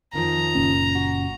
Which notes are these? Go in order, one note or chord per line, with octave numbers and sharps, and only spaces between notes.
F2 D#3 F3 A#5
F#1 A#2 C#4
F#4